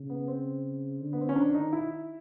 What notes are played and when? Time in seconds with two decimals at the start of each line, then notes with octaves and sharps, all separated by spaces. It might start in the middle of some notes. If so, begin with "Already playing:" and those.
Already playing: C#3
0.10 B3
0.28 C4
1.00 D3
1.13 B3
1.21 C4
1.29 C#4
1.36 D#3 D4
1.54 D#4
1.73 E4